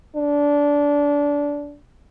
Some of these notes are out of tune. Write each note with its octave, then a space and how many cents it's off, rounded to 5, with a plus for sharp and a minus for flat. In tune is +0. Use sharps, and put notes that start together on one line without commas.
D4 -20